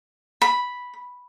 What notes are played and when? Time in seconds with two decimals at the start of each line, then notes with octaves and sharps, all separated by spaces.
0.42 B5